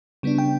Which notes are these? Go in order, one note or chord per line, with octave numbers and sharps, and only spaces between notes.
C#3 G3 B3 D4
G5